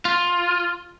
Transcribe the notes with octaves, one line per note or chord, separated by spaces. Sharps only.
F4